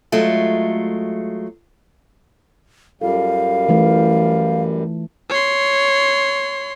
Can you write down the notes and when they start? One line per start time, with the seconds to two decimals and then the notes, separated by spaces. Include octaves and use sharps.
0.12 F#3 G#3 A3 F4
3.01 F#2 G3 F4 A4 F5
3.69 E3 A3
5.30 C#5 C6